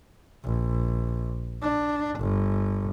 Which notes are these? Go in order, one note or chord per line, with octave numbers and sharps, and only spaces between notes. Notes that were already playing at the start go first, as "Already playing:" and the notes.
A#1
D4
G1